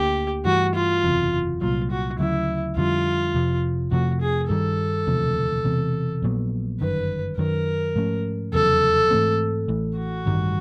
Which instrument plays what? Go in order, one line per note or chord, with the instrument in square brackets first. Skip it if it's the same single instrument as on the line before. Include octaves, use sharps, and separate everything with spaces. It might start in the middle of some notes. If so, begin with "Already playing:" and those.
Already playing: [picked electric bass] D2 D3 A#3 [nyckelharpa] G4
[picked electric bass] G2 E3 A3 [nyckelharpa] F#4
[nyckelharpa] F4
[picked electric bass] F#1 E2 C3 E3
[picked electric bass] C2 A#2 F#3 [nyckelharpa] F4
[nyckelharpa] F#4
[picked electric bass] D2 C#3 F#3 [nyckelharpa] E4
[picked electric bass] F2 D3 G3 [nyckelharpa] F4
[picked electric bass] F1 F2 C3
[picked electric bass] F2 C3 F3 A3 [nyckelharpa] F#4
[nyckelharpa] G#4
[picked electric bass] G2 D#3 G3 [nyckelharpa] A4
[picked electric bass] E1 D2 C3 F3
E1 E2 C3
A#1 A#2 F#3 B3
[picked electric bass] G1 F#2 D#3 [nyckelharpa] B4
[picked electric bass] F#2 D#3 F#3 [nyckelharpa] A#4
[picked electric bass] G#2 F3 A3 C#4
[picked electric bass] F1 E2 C#3 F#3 [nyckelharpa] A4
[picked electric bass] G#2 E3 A3 C4
A1 A2 E3
[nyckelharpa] F#4
[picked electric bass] A1 G2 D#3 G3